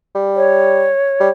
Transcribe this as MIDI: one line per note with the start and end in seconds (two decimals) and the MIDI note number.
0.15 0.88 55
0.36 1.30 73
1.20 1.29 55